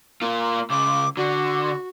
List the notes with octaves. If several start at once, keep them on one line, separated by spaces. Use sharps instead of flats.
A#3 F4
C#2 C#3 D6
D3 F#4